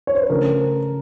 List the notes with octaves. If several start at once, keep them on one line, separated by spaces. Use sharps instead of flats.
C#5
C5
B4
C#3 F3 A3 D4 A#4